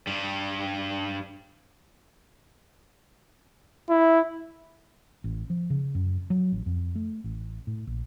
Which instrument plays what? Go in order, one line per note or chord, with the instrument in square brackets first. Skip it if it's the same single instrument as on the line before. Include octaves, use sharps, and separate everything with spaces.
[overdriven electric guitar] G2 G3
[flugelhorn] E4
[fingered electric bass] A1
F3
C#3
F#2
F#3
A1
F2
A3
A1
A2
A#1